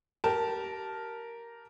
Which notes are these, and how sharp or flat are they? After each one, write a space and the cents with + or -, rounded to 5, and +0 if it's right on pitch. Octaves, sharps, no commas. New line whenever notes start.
G4 -20 A#4 +0 A5 +0